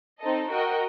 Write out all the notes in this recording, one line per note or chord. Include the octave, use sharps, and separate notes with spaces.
C4 D#4 A4 D#5
F#4 A#4 D#5 G5